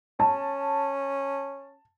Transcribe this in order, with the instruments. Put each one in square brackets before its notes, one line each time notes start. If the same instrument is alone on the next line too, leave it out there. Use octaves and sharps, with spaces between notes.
[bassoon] C#4 [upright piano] A5